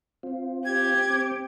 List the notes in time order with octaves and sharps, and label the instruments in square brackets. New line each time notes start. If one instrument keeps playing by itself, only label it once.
[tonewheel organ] C4 F4
[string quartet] G4 [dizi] G#6
[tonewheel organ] C4 D6